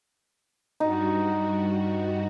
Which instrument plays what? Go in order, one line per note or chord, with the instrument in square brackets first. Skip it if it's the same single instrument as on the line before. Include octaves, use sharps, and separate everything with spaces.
[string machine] G2 G3 F#4 [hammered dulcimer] D#4